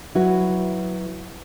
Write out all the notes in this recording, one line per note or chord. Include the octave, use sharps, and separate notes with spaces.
F#3 E4 F#4 B4